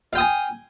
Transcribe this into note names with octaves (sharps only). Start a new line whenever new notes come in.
F5 G5 G#5 D#6